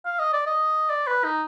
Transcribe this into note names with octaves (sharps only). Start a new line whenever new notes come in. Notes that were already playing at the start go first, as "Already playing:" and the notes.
F5
D#5
D5
D#5
D5
B4
D#4